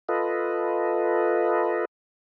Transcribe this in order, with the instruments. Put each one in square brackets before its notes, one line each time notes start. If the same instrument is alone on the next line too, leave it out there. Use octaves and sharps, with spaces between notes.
[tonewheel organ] F4 A4 B4 D#5